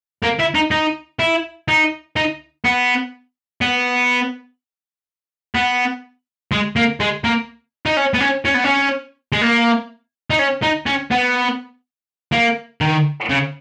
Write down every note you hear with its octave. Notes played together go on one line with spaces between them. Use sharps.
A#3
E4
D#4
D#4
E4
D#4
D#4
B3
B3
B3
G#3
A#3
G#3
A#3
D#4
C#4
B3
C#4
C#4
B3
C#4
G#3
A#3
D#4
C#4
D#4
C#4
B3
A#3
D#3
C#3